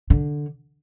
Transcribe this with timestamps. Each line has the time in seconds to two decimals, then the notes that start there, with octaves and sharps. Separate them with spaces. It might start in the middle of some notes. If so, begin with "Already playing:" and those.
0.10 D3